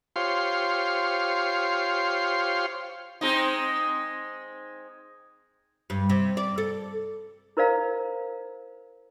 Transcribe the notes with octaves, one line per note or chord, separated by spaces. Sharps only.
F4 G4 C5 C#5 F5 C6
G#3 C4 D#4
G2
C3
D5
A4
E4 A#4 C5 D5 F5 A#5